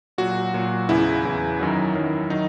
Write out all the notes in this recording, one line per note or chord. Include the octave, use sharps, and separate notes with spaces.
A#2 F#3 F#4
A#2 F#3
E2 C#3 E3 E4
E2 C#3 E3
F#2 D#3 F#3
F#2 D#3 F#3
D#3 F#3 D#4